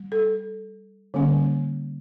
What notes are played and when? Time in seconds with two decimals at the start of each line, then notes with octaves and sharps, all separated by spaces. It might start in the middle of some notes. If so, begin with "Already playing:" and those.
Already playing: G3
0.12 A4
1.14 D3 G3 A#3 C#4